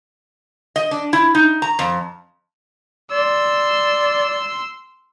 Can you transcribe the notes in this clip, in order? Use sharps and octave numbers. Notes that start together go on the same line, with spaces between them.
D#5
D4
E4
D#4
A#5
F2
D5 C6 E6